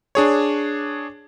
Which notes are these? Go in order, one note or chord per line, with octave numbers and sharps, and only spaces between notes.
D4 G#4 C#5